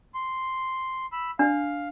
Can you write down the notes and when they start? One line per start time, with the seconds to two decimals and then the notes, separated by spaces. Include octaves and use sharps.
0.15 C6
1.12 B5 E6
1.39 D4 F5